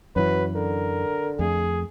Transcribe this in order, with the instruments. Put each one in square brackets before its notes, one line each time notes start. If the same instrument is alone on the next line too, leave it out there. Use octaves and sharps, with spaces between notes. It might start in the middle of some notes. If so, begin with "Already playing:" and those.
[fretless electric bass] F#2 E3 [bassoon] F#3 [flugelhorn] B4
[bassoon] D3 [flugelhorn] A#4
[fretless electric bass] F2 A3 [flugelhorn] G#4